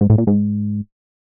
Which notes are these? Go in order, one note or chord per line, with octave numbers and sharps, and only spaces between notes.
G#2
A2
A#2
G#2